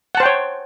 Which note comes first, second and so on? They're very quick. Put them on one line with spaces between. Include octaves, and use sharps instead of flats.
F#5 A5 C5 G5 C#5